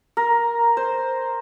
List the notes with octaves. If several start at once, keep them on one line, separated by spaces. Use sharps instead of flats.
A#4
C5